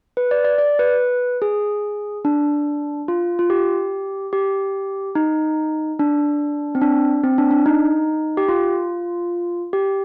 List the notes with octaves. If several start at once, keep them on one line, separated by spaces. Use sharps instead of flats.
B4
D5
D5
D5
B4
G#4
D4
F4
F4
G4
G4
D#4
D4
C4
D4
C4
D4
D4
D#4
G4
F4
G4